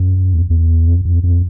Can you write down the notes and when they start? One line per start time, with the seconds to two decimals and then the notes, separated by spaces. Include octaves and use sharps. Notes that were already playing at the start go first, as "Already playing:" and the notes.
Already playing: F#2
0.34 E2
0.50 E2
0.88 F2
1.05 F2
1.23 F2